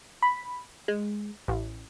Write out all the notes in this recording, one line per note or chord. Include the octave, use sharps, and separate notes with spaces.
B5
G#3
A1